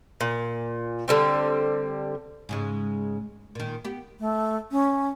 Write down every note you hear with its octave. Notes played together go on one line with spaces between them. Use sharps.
A#2
D3 G3 C4
G#2 C#3 G#3
A#2 D#3
B3 G4
A3
C#4